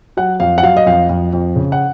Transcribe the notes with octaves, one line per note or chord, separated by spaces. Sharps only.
F#3 F#5
F2 F5
F#5
F#3 F5
D#5
F2 F5
F2
F2
C#3
F#5